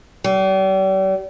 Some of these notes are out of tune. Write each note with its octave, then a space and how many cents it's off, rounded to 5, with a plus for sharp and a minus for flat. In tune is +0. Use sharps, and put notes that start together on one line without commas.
G3 -40